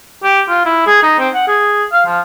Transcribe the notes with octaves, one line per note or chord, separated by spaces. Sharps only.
G4
F4
E4
G#4
D#4
C4
F#5
G#4
F5
F3